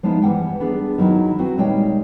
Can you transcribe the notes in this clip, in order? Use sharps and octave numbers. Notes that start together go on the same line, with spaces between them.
F3 G#3 B3 D#4 E4
E3 G3 F#5 G5
B3 D4 G#4
D#3 F#3 E4
C4 F#4 B4
A#2 D#3 G3 G#3 C#5 G5